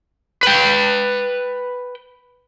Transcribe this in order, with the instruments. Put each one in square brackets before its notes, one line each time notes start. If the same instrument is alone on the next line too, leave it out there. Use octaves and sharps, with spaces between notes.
[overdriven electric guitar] B4 G5